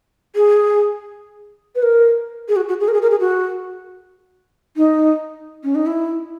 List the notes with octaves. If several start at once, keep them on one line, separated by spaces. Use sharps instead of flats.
G#4
B4
A#4
G#4
F#4
F#4
G#4
A#4
G#4
A#4
G#4
F#4
D#4
C#4
D#4
E4